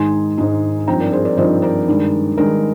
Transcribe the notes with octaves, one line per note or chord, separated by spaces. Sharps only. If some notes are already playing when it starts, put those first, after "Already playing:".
Already playing: G#2 D#3 G#3 D#4 G#5 C6
G#2 D#3 G#3 D#4
G2 F3 C4 D#4 G5 A#5
A#4 D5
G#4 C5
A#4 D5
G2 F3 C4 D#4 C5 D#5
A#4 D5
G2 D#3 G#3
G2 D#3 G#3 A#4